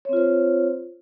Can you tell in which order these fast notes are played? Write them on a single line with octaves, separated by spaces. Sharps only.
C#5 C4 F4 C5